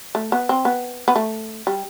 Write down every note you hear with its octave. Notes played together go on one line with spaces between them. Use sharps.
A3
B3
C4
B3
B3
A3
G3